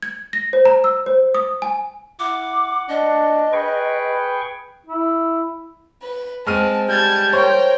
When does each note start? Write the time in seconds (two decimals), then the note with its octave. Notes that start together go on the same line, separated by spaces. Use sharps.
0.03 G#6
0.33 A#6
0.53 C5
0.65 A#5
0.84 E6
1.06 C5
1.35 D#6
1.62 G#5
2.19 E4 F#5 D6
2.89 D4 D#5
3.53 G#4 B4 G5 C#6
4.86 E4
6.03 B4
6.47 G#3 C4 A5 F6 D#7
6.89 G3 A5 G#6
7.33 A#4 C5 C#5 G5